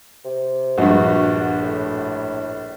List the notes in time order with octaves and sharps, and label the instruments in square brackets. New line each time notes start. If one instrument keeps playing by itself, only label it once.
[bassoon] C3
[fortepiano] A#1 G2 [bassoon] F#4
[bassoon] A2